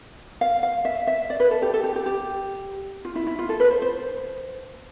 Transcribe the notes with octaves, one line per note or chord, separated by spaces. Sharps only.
F5
F5
E5
E5
D5
B4
A4
G4
A4
G4
G4
G4
F4
E4
E4
F4
A4
B4
C5
C5